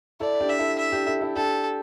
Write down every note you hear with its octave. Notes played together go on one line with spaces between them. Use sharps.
E4 A4 D5
D4 G4
E5
E4 A4
E5
D4 G4
E4 A4
E4 A4
D4 G4 A4